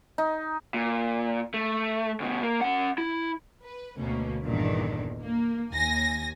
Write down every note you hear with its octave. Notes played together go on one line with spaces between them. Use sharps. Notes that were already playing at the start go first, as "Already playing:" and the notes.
D#4
A#2
A3
D2 B2
A#3
C#4 F#5
E4
B4
D2 B2 A#3 C#4
G1 E2 G2 A#2 D3 D#3
A#3
D#2 G#5 A#6